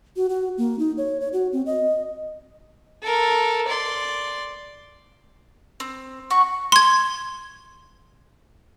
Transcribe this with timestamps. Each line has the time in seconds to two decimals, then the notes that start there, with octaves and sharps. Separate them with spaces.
0.17 F#4
0.29 F#4
0.58 A#3
0.79 D#4
0.97 C#5
1.21 C#5
1.33 F#4
1.53 C4
1.66 D#5
3.03 A4 A#4
3.68 D5 C6
5.80 C4
6.30 F#4 C#6
6.72 C6 G#6